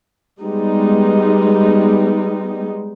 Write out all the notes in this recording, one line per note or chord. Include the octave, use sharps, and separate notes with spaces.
G3 G#3 B3 D#4